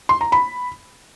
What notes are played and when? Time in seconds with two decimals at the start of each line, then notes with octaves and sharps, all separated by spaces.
0.09 C6
0.21 A#5
0.32 B5